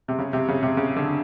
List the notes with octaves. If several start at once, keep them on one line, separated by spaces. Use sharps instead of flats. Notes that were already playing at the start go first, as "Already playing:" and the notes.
C3
C#3
C3
C#3
C3
C#3
D3